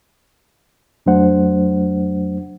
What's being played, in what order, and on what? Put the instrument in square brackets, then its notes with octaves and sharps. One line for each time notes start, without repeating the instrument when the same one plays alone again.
[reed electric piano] F2 F#3 A3 D4 C5 F#5